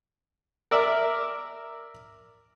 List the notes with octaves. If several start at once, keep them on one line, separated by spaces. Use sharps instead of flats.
A#4 D5 E5